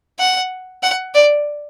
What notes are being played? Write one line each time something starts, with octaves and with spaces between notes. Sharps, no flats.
F#5
F#5
D5